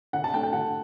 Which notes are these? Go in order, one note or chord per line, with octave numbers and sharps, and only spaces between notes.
D3 F#5
A5
A3 D4 G5
G5
D3 F#5